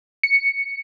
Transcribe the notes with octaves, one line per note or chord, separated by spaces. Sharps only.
C#7